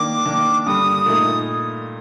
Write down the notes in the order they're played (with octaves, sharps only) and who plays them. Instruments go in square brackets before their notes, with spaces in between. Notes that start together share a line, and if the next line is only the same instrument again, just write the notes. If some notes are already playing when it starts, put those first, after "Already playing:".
Already playing: [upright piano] D#3 A#3 D4 [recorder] D6
[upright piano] D#3 A#3 D4
[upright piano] G2 D3 G3 [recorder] D#6
[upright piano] A#2 A3 D#4